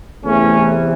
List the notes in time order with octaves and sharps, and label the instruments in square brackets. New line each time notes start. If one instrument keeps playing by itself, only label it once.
[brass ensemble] E2 C3 E3 A3 C#4